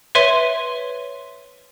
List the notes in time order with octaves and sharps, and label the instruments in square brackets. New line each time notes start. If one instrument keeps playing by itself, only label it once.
[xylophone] B4 C#5 E5 C6 D#7 G7